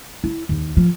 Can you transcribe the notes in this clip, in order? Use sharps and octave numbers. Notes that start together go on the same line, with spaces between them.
E4
D#2
F3